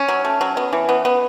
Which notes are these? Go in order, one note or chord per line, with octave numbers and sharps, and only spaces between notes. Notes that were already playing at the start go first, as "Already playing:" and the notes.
Already playing: C#4
F#3
A3
F#3
B3
E3
B3
B3